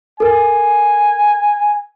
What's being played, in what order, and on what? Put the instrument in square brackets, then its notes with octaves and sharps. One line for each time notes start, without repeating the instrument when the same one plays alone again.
[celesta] A4 A#4 [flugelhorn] G#5